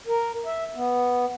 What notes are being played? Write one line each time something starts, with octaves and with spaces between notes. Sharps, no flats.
A#4
E5
B3